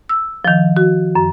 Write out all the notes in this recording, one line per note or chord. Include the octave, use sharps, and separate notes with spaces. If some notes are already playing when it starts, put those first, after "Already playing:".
E6
D#3 F3
F#4
F#2